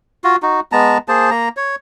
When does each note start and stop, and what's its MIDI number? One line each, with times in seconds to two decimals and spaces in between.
0.24 0.36 65
0.24 0.36 66
0.43 0.60 63
0.43 0.60 66
0.72 0.98 56
0.72 0.98 59
0.72 0.98 81
0.72 0.98 82
1.08 1.30 58
1.08 1.30 68
1.08 1.30 72
1.08 1.30 81
1.31 1.49 58
1.31 1.49 82
1.57 1.76 73